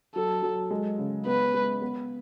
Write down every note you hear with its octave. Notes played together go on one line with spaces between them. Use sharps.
F#3 A4
F#3
G#3
C#3
B3 B4
G#3
B3